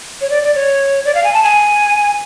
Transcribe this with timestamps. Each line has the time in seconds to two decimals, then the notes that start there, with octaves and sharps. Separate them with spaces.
0.21 C#5
0.30 D5
0.43 D5
0.55 C#5
1.05 D5
1.15 F5
1.24 G#5
1.33 A5
1.43 G#5